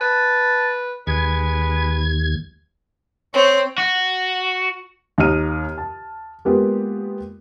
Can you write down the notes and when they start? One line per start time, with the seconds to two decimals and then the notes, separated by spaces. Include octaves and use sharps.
0.01 B4 A5
1.07 D#2 G#3 B4 G#6
3.34 C4 C#5
3.78 F#4
5.18 D#2 D#4 D#5 A#5 F6 D#7
5.78 A5
6.45 G#3 A#3 B3 F4 G4